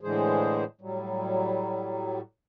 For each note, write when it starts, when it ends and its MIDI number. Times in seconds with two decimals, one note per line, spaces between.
0.01 0.64 45
0.01 0.64 50
0.01 0.64 52
0.01 0.64 56
0.01 0.64 68
0.01 0.64 72
0.81 2.20 45
0.81 2.20 54
0.81 2.20 55